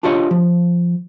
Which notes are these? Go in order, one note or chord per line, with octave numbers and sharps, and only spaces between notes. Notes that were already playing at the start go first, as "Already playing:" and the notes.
D4 F4 G4 C#5 D#5
F3